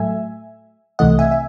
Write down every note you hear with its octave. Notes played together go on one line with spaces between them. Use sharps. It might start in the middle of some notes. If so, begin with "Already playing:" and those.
Already playing: A2 F#3 A3 E5 G#5
C2 C3 E3 A3 D#5 F#5
E5 G#5
E5